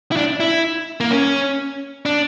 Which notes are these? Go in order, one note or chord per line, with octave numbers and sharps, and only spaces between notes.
E4
D4
E4
A#3
C#4
D4